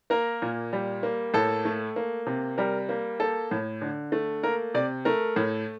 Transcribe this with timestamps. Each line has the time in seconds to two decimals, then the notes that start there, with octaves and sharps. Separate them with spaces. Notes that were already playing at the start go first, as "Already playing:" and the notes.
0.10 A#3 A#4
0.42 A#2
0.73 G3
1.03 A#3
1.34 A2 A4
1.65 A3
1.96 A#3
2.26 C3
2.58 G3 A#4
2.89 A#3
3.20 A#3 A4
3.51 A2
3.82 D3
4.12 A3
4.43 A#3 A#4
4.74 C3 D5
5.05 A3 A#4
5.36 A2